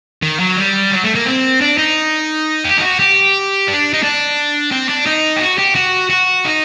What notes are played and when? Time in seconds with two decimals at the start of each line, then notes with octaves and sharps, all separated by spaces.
0.23 D#3
0.40 F#3
0.57 G3
0.91 F#3
1.04 A3
1.15 A#3
1.26 C4
1.61 D4
1.78 D#4
2.64 G4
2.77 D#4
2.81 F#4
3.00 G4
3.68 D4
3.93 D#4
4.03 D4
4.72 C4
4.89 D4
5.06 D#4
5.36 G4
5.41 F#4
5.58 G4
5.75 F#4
6.10 F#4
6.45 D#4